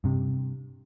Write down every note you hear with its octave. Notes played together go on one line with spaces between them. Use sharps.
G2 C3